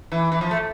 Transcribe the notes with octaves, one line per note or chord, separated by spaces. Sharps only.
E3
E3
F3
A3